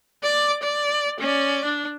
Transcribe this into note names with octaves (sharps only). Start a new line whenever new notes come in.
D5 D6
D5
C#4 D5
D4